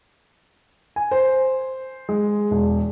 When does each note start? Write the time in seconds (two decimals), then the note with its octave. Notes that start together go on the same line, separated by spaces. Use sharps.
0.96 G#5
1.11 C5
2.09 G#3
2.51 E1